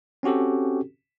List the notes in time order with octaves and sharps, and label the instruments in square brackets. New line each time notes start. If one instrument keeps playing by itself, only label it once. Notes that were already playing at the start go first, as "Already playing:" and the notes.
[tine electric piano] C4 C#4 F#4 G4 A4